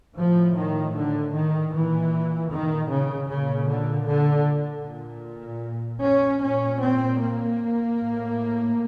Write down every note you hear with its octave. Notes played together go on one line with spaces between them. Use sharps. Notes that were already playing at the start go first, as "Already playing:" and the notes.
A2 F3
D#3
D3
D#3
A#2 E3
D#3
C#3
A#2 C#3
D3
D3
A#2
C#4
A#2 C#4
C4
A#3
A2